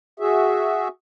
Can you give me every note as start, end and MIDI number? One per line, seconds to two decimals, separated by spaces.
0.20 0.88 66
0.20 0.88 68
0.20 0.88 76